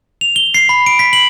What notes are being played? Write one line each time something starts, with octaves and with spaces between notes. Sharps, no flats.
F7
G7
C7
B5
D7
B6
F#7